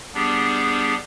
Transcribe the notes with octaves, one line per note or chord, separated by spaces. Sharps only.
G3 B3 D4 G4 G#4